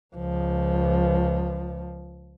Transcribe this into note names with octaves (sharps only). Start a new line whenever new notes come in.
C#2 F3